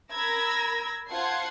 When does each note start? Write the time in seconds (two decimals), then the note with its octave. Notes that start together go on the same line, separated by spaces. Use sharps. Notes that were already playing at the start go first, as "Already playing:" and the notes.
0.11 A#4 B5 E6 G#6 A#6
1.09 F4 C5 F#5 A5 G#6 C7